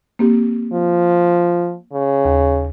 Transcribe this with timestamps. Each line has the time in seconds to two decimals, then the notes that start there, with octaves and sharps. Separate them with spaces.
0.19 A#3 C4 G4
0.73 F3
1.93 C#3
2.25 D#2